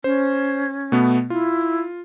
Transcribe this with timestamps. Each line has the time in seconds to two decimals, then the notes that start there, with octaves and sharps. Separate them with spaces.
0.04 C#4 C5
0.92 B2 A3 B3
1.30 E4 F4